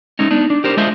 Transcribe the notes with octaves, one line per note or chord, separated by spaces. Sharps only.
G#3 A3 C#4 D#4
B3 D4 D#4
D4
G4 A#4 C5
G#3 D4 F4 C5 D#5 E5